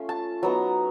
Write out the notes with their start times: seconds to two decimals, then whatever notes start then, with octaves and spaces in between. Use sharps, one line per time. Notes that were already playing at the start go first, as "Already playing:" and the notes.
Already playing: A3 C#4 F4
0.09 A5
0.43 F#3 B3 D#4 A#5